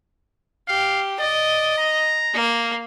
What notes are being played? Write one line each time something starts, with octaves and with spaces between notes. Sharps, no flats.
G4 F5
D5 D#5
A#5
A#3